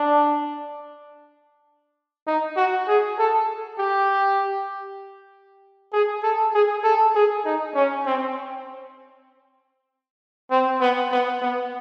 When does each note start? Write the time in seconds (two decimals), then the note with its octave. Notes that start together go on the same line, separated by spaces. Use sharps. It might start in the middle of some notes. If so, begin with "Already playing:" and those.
Already playing: D4
2.27 D#4
2.57 F#4
2.88 G#4
3.18 A4
3.78 G4
5.93 G#4
6.23 A4
6.54 G#4
6.84 A4
7.15 G#4
7.46 D#4
7.75 C#4
8.06 C4
10.51 C4
10.81 B3
11.12 B3
11.42 B3